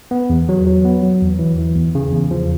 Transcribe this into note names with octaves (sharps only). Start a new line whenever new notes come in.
B3
E2
F#3
F#3
B3
F#3
E2
E3
E3
E2
C#3
E2
F3